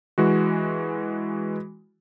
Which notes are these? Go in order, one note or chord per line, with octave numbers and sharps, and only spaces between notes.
E3 G#3 F#4